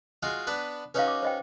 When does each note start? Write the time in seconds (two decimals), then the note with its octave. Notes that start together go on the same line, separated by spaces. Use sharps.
0.23 G#3 F4 F#4
0.47 B3 D4 B4
0.94 C#4 D#4 F#4 B4 F5
1.07 D6
1.23 C5 D#5 G5